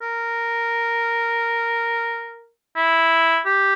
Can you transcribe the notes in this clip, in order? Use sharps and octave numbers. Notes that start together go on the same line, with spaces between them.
A#4
E4
G4